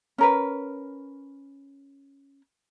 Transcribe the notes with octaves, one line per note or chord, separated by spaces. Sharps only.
C#4 A#4 B4